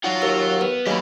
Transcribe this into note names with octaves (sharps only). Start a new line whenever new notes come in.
F#3 D#4 F4 C#5 F5 F#5
D#2 E6
B3 B4
C#3 F#3 A#3 G4 D#5 B5